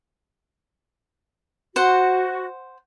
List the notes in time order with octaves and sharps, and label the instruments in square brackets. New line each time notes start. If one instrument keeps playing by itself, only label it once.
[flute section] F#4 [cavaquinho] C5 F#5